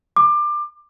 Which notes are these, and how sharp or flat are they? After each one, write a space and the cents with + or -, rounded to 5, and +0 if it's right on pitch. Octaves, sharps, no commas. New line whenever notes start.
D6 +25